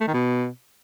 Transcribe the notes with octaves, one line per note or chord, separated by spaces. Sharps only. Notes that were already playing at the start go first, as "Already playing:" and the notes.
A3
D#3
B2